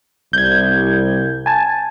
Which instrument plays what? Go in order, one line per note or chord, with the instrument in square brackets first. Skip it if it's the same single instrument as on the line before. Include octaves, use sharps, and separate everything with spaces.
[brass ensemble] C2 [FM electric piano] G6 G#6
[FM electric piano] G#5 A5